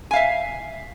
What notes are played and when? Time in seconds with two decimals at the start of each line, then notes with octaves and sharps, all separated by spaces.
0.11 G#5
0.13 F5
0.16 E5